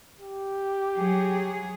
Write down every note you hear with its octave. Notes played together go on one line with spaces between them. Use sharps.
G4
F#3 G#4